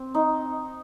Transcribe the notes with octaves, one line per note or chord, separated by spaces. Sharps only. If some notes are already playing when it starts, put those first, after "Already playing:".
Already playing: C4
D#4